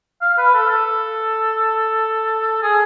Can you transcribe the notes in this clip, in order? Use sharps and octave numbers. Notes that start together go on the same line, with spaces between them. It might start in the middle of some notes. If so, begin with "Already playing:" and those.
F5
B4
A4
A4
G#4